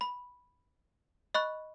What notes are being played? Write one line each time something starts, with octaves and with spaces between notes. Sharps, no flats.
B5
D#5 B5 C#6 F#6